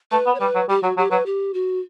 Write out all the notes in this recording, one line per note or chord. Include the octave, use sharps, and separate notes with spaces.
A3 B4
B3
C#5
G3 B4
F#3
G3 G4
F#3 F#4
F#3 G4
F#3 B4
G4
F#4